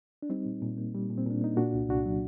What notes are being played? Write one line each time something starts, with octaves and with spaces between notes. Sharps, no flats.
D4
G3 C4 D#4
A#2
A#2
A#3
G3
A#2
C4
A#2 D4
A#3 D#4
A#2 D4 F#4
C2
C2 D4 F#4
F#3